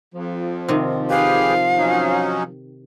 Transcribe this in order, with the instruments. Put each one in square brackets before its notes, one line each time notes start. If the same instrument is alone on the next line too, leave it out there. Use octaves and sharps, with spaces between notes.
[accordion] F2 [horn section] F3
[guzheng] C3 D#3
[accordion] G4 G#4 B4 [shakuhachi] F5
[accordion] F#3 C#4 D#4